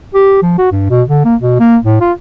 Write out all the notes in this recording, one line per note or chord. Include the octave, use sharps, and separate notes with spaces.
G4
F3
F#4
G2
B2
D3
A#3
B2
A#3
A2
F4